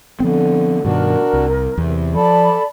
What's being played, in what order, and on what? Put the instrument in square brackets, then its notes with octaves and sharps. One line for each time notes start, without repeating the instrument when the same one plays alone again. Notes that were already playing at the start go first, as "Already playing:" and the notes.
[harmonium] D3 [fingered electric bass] F3 B3 C4
[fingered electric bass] G2 B2 D#3 [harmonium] D4 F#4 [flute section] A#4
[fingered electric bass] C2
[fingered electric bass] E2 [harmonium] C3
[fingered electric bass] F3 [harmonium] A4 [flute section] D5 A5 B5